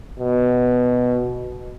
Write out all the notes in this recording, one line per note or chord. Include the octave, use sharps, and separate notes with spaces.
B2